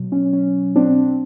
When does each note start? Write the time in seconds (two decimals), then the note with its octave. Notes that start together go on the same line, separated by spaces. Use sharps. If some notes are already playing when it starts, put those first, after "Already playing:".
Already playing: B2 F#3
0.12 C#4
0.33 C#4
0.76 C4 D4